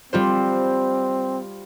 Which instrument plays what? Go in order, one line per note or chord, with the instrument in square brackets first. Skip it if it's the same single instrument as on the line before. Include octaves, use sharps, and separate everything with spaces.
[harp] G3 F4 C5 [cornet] C4